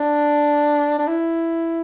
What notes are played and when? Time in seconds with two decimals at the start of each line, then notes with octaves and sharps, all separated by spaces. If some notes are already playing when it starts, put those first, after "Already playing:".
Already playing: D4
0.99 D4
1.07 E4